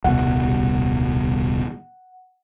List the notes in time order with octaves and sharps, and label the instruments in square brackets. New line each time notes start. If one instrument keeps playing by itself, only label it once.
[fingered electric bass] D#1 C2 B2 [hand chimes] F#5